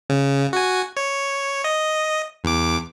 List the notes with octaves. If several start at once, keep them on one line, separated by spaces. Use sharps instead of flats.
C#3
F#4 G#5
C#5
D#5
E2 D6